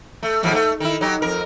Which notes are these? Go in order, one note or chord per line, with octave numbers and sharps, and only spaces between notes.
A3
D#2 G#2 F3
A3
D#3 E4
F#3 D#4 G4
F2 A#4